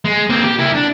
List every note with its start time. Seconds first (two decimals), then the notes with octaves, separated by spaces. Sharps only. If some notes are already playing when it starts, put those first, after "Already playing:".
0.05 G#3
0.30 A#3 C4
0.44 G4
0.59 E4 A#4
0.75 D4